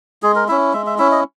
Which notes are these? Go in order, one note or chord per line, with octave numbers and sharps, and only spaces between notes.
G#3 G#4
A#4
C#4 E4 E5
G#3 E5
E5
C#4 E4 E5
D#5